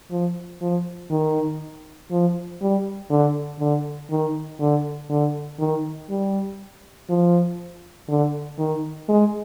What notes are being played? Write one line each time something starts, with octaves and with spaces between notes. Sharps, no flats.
F3
F3
D#3
F3
G3
D3
D3
D#3
D3
D3
D#3
G3
F3
D3
D#3
G#3